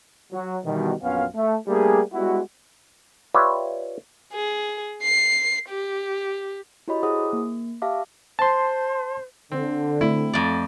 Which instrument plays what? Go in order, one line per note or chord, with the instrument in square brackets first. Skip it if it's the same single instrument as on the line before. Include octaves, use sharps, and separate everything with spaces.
[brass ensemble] F#3
B2 D#3 E3 G3
A#1 F#2 B3 C#4 F4 F5
A3
G3 A3 A#3 D4 G4 G#4
G3 G#3 B3 E4 F#4
[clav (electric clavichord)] F4 G4 B4 C#5 D5 E5
[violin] G#4
C7
G4
[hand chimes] E4 F#4 G4 C#5 D#5 B5
E4 G#4 C5 F#5 D#6
A#3
G4 E5 F5 A5 D6
[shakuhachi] C5 [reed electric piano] A5 C6
[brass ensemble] D3 [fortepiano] C4
[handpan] A3 C4 [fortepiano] E4
[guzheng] F2 D5